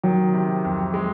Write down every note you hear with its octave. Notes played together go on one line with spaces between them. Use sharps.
D#3 F#3
C3
F2
G#3